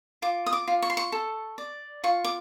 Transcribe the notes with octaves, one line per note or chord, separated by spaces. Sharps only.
F4 D6
D#6
D6
F4
C#6
C6
C#6
A4
D5
F4 C#6
D6